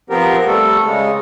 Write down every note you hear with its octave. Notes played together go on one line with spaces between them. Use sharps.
F3 B3 C4 G4 A#4
G3 A3 A4
C#3 G#3